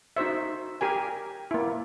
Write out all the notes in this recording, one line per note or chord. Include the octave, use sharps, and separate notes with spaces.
D#4 F#4 C5 E5
G4 A#4 G#5
A#3 E4